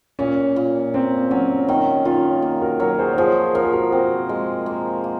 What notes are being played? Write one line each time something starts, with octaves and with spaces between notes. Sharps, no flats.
A#2 C#4
A#2
A#3 C4
F#3 C#4
D#3 C#4
D#3 C#4 F4
A#3
F#4 A#4
F#3 A#4 C#5
G#4 C5
C#5
F3 G#4 C5
F3 A#4
G#4
F#4 A#4
C4 F#4 A#4
G#3
A#3
A#3